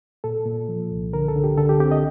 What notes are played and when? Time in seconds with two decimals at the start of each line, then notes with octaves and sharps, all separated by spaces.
0.24 A#2 A4
0.46 A#2
0.69 F3
0.91 C2
1.13 D3 A#4
1.28 A4
1.36 D3
1.44 G4
1.57 D3 A4
1.69 G4
1.80 C4 G4
1.91 D#5